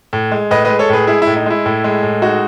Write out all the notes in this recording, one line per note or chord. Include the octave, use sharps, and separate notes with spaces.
A2
G#3
A2 B4 D#5
G#3 B4 D#5
A4 C#5
A2 G#4 B4
G#3 E4 G#4
E4
A2
D#4
G#3 E4
A2
G#3
A2
G#3 D#4 F#4